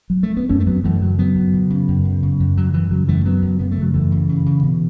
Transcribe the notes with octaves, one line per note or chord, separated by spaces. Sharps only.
F#3
A3
B3
F#2 A3 C#4
A3
F#2 F#3 B3
F#2 E3 A3
C#3 F#3
F#2 F#3 B3
F#2
C#3
C#3
F#2
C#3
C#3
F#2
F#2 F#3
C#3 E3
C#3 F#3
F#2 E3 A3
C#3 F#3 B3
F#2
C#3 B3
A3
C#3 F#3
F#2 E3 A3
C#3
C#3
C#3
B2